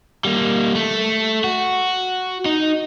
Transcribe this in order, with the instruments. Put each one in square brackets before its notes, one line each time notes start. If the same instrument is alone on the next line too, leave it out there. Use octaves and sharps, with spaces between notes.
[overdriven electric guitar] G3 A#3
A3
F#4
D#4